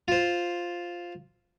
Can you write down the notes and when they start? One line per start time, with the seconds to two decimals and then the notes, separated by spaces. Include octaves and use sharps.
0.08 F4 C5